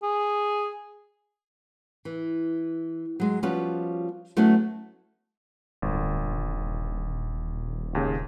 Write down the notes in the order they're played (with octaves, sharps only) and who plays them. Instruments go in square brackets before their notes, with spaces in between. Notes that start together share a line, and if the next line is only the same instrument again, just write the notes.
[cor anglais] G#4
[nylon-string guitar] E3
F#3 G#3
F3 G3 B3 C#4 F4 F#4
F#3 A3 B3 C#4 E4 F#4
[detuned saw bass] D1 [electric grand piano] G1
[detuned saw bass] D#1
[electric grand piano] G#1 D#2 C#3